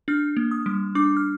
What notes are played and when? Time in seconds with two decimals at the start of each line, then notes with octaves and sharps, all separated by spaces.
0.08 D4 F6
0.37 A#3
0.51 D#6
0.66 G3
0.95 D4 D6
1.17 F6